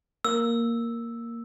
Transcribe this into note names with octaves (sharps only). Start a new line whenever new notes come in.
A#3 E6